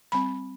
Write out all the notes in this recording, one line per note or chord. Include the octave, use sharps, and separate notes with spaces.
G3 C4 B5